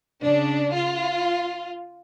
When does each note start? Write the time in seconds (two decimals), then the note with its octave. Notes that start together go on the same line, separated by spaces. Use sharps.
0.22 C#3 D4
0.74 F4